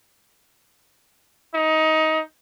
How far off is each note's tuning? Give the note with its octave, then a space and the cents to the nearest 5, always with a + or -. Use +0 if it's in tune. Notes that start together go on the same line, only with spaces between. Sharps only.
D#4 +20